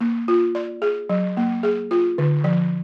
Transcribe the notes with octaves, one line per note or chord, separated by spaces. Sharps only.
A#3
F4
D5
G#4
F#3
A#3
G#4
F4
D3
F3